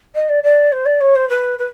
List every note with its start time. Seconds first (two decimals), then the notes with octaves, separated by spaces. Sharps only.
0.15 D#5
0.29 D5
0.43 D5
0.72 C5
0.85 D5
1.00 C#5
1.15 C5
1.29 B4
1.58 B4